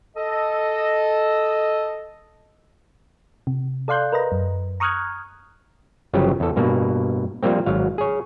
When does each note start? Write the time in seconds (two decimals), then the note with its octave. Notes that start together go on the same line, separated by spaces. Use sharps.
0.17 A4 D#5
3.47 C3
3.88 A4 D5 F5 C6 F#6 G6
4.12 A#4 B4 D#5 A#5
4.32 F#2
4.80 A#5 C#6 D#6 F6 F#6 G#6
6.13 G1 C#3 F3 F#3 G4
6.40 E2 A4
6.56 G2 B2 A#3
7.43 F3 G3 A#3 C4
7.66 G#1 F#3 F5
7.98 G#4 C#5